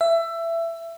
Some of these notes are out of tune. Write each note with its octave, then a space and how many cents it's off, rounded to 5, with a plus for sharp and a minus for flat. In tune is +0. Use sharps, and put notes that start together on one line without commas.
E5 +20